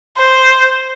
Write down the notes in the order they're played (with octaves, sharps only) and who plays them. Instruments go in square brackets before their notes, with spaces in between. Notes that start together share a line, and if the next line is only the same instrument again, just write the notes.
[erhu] C5